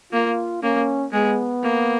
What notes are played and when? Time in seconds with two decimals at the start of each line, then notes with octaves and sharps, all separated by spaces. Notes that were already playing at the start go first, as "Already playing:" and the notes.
0.13 A#3 F4
0.62 A#3 C#4
1.13 G#3 B3
1.63 A#3